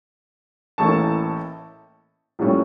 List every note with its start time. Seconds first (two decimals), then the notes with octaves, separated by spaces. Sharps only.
0.78 A1 A2 E3 A#3 A5 C#6
2.39 A#1 A2 G3 C#4